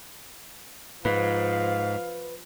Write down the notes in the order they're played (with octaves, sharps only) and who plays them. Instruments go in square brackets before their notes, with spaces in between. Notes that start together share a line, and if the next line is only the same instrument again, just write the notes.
[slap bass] G#2 [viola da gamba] F3 [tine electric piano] B4 [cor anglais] F5